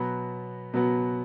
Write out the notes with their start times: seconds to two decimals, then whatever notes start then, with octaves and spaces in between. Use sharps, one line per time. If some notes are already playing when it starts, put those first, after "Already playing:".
Already playing: B2 F#3 B3
0.74 B2 F#3 B3